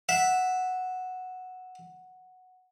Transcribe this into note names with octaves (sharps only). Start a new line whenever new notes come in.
E5 F#5